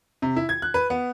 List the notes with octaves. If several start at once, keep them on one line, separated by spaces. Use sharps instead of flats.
C3
E4
G#6
F#6
B4
B3